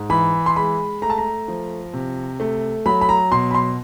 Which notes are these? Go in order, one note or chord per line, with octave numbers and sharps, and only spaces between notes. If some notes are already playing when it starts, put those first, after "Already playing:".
Already playing: G#2
E3 B5
C6
G#3 B5
A3 A#5
A5
A#5
F3
C3
A3
F#3 B5
B5
A#5
B2 C6
B5
C6